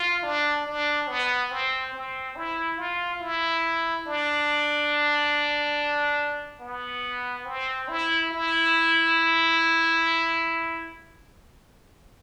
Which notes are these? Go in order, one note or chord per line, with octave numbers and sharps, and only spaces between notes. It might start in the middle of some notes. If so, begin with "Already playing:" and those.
Already playing: F4
D4
D4
B3
C4
C4
E4
F4
E4
D4
B3
C4
E4
E4